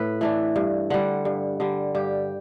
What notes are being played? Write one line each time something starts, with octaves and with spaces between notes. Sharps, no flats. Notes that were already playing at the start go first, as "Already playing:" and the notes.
Already playing: A2 B4
E3 A3 D4
G2
D3 G3 F#5
G2
D3 G3
G2 G4